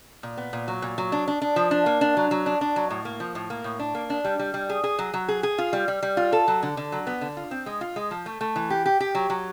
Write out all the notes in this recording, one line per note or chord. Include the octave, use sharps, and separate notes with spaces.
A#2
B3
A#2
F#3
A#2
F#3
D4
D4
D4
F3
D4
A#3
D4
F#3
F#3
D4
D4
F#3
A2
A#3
F3
A2
A#3
A2
D4
A#3
D4
G3
G3
G3
G#4
G#4
F#3
F#3
G#4
G#4
F4
G3
G3
G3
F4
A4
F#3
D3
D3
F#3
B3
D3
F4
C4
G#3
F4
G#3
F3
A3
A3
E3
G4
G4
G4
F#3
F#3